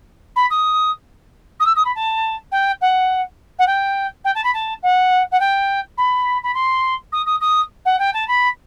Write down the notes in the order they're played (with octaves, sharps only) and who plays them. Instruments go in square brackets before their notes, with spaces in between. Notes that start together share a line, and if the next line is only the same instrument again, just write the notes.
[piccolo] B5
D#6
D#6
E6
D#6
B5
A5
G5
F#5
F#5
G5
G5
A5
B5
A5
F#5
F#5
G5
B5
B5
C6
D#6
D#6
D#6
F#5
G5
A5
B5